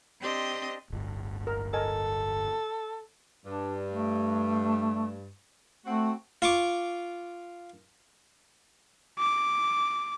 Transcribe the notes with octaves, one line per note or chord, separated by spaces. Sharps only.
C4 D4 G4 D#5 C6
D1 G1
A#4
A4 A#4 D#5 G#5
G2 D4
A3
A3 C4 F#4
F4 C#6 D6
D6